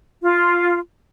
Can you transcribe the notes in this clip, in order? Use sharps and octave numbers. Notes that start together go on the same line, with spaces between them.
F4